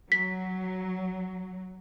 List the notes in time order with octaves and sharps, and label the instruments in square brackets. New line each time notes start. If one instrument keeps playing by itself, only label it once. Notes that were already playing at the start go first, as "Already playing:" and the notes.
[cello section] F#3 [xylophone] B6